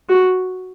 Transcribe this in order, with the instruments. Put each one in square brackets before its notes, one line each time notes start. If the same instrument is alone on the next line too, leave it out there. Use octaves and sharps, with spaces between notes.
[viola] F#4